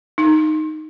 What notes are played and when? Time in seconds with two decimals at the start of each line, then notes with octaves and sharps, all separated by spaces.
0.18 D#4